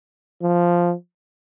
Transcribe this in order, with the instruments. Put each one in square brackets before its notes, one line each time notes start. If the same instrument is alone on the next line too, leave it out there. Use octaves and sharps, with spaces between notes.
[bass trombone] F3